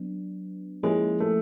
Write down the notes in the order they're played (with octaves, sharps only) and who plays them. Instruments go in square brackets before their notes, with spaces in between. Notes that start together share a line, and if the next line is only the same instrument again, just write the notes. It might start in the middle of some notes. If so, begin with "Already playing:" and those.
Already playing: [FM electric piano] F#3 B3 D4
[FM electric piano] F3 A#3 C#4 E4 [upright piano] G#3
[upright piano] A3